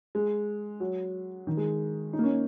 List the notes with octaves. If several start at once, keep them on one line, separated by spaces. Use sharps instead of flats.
G#3
F#3
D#3
G#3
D#4
A#3
C#4